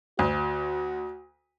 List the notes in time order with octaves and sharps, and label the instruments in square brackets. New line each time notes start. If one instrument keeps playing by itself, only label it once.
[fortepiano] D2 [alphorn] F#4